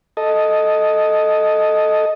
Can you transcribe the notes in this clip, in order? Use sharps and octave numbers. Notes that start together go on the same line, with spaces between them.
A4 D#5